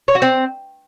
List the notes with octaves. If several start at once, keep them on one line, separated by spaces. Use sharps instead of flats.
C#5
F#4
C4